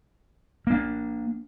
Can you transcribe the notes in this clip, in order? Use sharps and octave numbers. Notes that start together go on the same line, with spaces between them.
A#3 D4